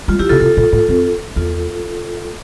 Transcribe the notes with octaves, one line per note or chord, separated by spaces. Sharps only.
G3 F4
F3 E4 G4
C3 F4 A4
C3 F4 A4
A#2
A2
F2
E2 F4 A4